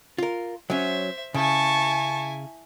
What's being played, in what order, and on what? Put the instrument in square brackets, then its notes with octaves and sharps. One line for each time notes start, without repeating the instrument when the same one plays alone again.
[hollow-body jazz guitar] F4 A#4
[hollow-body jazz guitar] F#3 C#4 [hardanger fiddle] C5 E5
[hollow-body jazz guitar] C#3 [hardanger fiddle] E4 G#5 [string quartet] A5 C#6